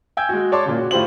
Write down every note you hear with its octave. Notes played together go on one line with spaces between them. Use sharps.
G5 G#5 E6 G6 G#6
G#3 F#4
C#5 D5 A5 C6 D6
A#2 C#3
F#4
A2 F4 G4 C5 F#7